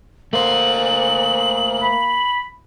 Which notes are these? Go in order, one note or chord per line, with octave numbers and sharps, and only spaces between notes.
A3 A#3 C5 F#7
B5